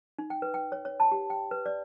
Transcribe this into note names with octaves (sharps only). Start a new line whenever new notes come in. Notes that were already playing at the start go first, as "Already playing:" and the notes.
D#4
G5
B4
G5
C#5
C#5
A5
G4
G5
B4
D5